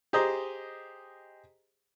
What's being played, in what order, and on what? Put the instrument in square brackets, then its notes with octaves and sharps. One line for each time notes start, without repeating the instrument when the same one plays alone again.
[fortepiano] G4 G#4 C5 D#5 A#5